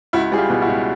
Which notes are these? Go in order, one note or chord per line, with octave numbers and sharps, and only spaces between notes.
C#2 E4 F#4
G3 G#4
F4 G4
B2
E4 F#4
C#2